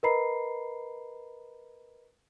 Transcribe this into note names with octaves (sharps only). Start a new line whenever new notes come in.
A#4 B4 D#5 A#5 B5 C7